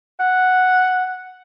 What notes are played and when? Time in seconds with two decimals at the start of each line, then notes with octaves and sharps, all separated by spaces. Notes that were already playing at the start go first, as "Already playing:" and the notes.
0.19 F#5